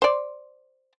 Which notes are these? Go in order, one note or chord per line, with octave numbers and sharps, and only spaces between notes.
C5 D5